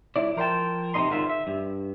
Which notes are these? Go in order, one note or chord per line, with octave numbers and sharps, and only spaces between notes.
C#2 E4 D5
F3 A#4 C5 D#5 G5 A5
F2 C3 C4 D#4 D#5 C6
C#2 G#2 D3 D#3 F4 E5
E5
G2